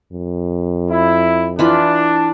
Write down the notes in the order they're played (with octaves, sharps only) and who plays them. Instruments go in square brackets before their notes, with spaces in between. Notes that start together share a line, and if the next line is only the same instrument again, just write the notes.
[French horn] F2
[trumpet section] E4
[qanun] E3 F4 B5 [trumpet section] D4